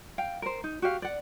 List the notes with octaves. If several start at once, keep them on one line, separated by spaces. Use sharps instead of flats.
F5 G5
A#4 C5
D#4
F#4 G4 F5
D5 F#5